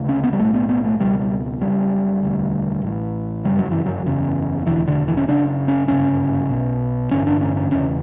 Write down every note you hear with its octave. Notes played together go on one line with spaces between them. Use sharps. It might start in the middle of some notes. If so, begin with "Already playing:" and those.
Already playing: D2 C#3
C#4
B3
G3
B1 A2 A3
B3
B3
A3
C#2 B2 G3
G3
F#1 F#2 C#3 G3
E1 D2 D3
A1 A2
G1 F#2 C#3 G3
F#3
E3
F#3
F#1 E2 C#3
E1 D2 D3 E3
D3
E3
C#4
F#1 F#2 C#3 D4
C#4
G1 F#2 C#3 C#4
B1 B2
A1 G2 D3 C#4
D4
C#4
C#4
E1 E2 C#3 C#4